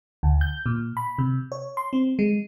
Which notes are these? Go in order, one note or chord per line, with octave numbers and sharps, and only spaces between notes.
D2
G6
A#2
B5
C3
C#5
C6
C4
G#3